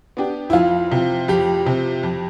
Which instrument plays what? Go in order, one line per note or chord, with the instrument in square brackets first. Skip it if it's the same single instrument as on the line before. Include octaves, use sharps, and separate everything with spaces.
[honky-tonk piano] B3 D4 G4
[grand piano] E4
[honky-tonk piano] F2 [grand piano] F4
[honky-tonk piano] C3 F3 C4
[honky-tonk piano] F2 [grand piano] G4
[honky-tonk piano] C3 F3 C4
F2